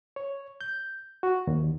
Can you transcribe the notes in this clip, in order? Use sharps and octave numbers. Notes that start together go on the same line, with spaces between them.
C#5
G6
F#4
D#2